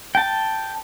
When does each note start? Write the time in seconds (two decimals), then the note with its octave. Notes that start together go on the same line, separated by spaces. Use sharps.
0.15 G5 A5